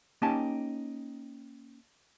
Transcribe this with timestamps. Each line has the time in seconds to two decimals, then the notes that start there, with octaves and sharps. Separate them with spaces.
0.22 A#3 C#4 D#4 G4 G#5 A5